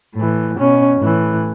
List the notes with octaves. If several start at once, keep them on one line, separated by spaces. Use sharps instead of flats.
A2 E3
B2 C#4
A2 E3